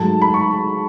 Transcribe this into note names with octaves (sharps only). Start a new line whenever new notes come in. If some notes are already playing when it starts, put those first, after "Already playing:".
Already playing: G#2 F#3 A3 A5
B5
C#6